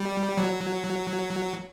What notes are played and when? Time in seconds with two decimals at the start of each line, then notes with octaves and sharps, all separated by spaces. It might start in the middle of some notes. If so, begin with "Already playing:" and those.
Already playing: G3
0.37 F#3